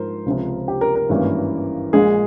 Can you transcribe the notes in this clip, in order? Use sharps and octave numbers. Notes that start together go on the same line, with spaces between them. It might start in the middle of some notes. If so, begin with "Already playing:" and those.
Already playing: G#2 F3 A#4 C5
C#2 C3 F3
G4
A#4
A#4
G#1 G2 E3 A#3 C#4
A#1 A#2 G#3 G#4